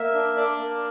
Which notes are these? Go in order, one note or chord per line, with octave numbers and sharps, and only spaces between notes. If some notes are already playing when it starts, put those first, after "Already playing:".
Already playing: A#3 E5
D4
D4 D5
A#3